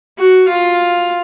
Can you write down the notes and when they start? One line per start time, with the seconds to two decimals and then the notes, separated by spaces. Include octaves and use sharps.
0.18 F#4
0.49 F4